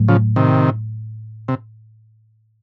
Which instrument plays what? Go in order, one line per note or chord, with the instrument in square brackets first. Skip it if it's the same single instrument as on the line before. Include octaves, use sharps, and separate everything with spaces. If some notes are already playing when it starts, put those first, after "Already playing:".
Already playing: [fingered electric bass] A2 F#3 A3
[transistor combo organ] C#3 F3
C3 D#3
C3